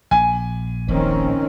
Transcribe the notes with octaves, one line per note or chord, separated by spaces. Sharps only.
A#1 G#5
D#1 A#1 D#3 C4 C#4